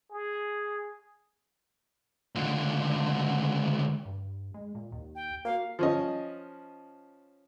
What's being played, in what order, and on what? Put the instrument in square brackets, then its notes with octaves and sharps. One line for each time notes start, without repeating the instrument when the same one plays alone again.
[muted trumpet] G#4
[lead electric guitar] C#2 D3
[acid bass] G2
G#3
A#2
D#2
[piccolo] G5
[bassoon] A#3 [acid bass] F#4 [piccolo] F5
[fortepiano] F3 C#4 D#5